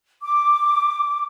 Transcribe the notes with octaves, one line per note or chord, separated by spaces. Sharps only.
D6